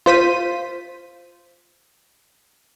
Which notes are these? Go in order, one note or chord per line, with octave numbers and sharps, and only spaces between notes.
F4 C5 B6 D#7